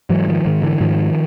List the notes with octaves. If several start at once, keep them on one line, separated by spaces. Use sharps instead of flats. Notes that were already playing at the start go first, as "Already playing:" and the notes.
G#2 E3 F#3
D#3 F3
G#2 D#3
D3 E3
G#2 D#3 F3